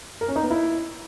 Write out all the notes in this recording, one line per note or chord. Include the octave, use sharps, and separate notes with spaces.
A#4
C#4
D#4
B3
E4